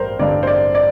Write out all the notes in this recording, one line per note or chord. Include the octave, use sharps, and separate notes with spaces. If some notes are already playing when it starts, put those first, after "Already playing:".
Already playing: A1 G2 A#4 C5
A1 G2 D3 D5
C5
D5
D5